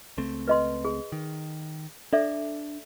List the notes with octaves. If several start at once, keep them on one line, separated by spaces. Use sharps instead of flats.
C#2 A3 C4
B4 D#5 C6
G#4
D#3
D4 A4 D5 E5